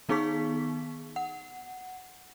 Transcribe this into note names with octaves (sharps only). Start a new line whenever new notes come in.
D#3 B3 D#4 G#4 C#6 B6
F#5